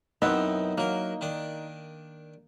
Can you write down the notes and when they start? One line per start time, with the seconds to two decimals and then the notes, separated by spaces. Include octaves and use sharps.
0.22 B1 F#2 B3 C4 D#4 E4 E5
0.78 F#3 A#3 A#4
1.21 D#3 D4